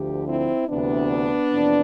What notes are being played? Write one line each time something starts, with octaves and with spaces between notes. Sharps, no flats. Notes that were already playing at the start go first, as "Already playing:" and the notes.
Already playing: D2 D3 F3 G4
C4 E4
D2 C3 E3 B3 D4
F2 C3 E3